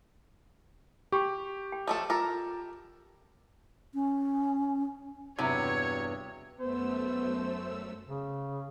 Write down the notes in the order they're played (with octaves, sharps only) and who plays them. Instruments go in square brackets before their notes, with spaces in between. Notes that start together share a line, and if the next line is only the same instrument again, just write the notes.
[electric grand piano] G4 [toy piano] G5 C6 C#6
[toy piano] G5
[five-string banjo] F3 A3 A4
[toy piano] F4 D6 [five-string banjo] A4 A#4
[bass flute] C#4
[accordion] E2 G2 [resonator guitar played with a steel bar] C3 [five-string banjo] F#3 E4 [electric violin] C#5
[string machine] F#2 A3 E6 [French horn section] B3 [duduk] C5
[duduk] C#3